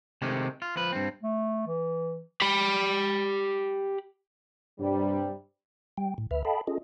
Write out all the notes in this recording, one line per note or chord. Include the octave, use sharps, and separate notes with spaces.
C3 D#3 G#3 A3 G4
F4
F3 B4
G2 C4
A3
E3
G4 B5
G2 C3 G3
G3 G5
A2
D2 B4 E5 F6
A4 D#5 F5 G5 A5 B5
C#4 F4 G#4 A4 D#5